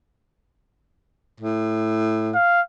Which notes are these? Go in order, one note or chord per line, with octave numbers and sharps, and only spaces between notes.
A2
F5